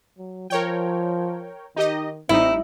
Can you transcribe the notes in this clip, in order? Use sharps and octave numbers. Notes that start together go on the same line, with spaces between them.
F#3
F3 A#4 C#5 G5
D#3 D#4 G4 D#5
A1 G3 C4 D#4 E4